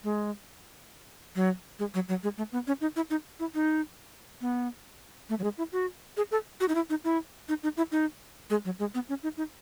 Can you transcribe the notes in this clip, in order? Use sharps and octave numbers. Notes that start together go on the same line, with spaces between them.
G#3
F#3
G#3
F#3
F#3
G#3
A3
B3
C#4
D#4
E4
D#4
E4
D#4
B3
A3
F#3
G#3
E4
F#4
G#4
A4
F#4
D#4
E4
D#4
E4
D#4
D#4
E4
D#4
G#3
F#3
G#3
B3
C#4
D#4
D#4